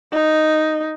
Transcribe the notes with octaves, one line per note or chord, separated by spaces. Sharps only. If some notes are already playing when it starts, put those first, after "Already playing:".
D#4